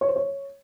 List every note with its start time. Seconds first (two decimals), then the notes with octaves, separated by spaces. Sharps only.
0.01 C#5
0.08 C5
0.16 C#5